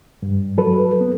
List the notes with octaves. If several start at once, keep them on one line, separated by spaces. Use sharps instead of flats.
G2
F#3 A4 B4
B3